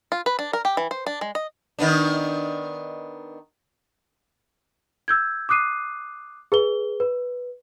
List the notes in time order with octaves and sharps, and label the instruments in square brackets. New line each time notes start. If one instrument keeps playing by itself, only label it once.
[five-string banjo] F4
B4
D4
A#4
G4
E3
C5
D4
G#3
D#5
[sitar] D#3 B3 D4
[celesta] E6 G6 G#6
D6 D#6 F#6 C7 D#7
G#4 B4 G7
B4